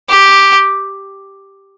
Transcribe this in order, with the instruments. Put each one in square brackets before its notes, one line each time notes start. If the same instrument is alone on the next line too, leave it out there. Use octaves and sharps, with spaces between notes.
[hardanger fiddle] G4